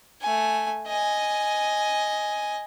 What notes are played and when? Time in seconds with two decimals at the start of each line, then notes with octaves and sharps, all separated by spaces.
0.22 A3 G#5
0.88 D#5 G#5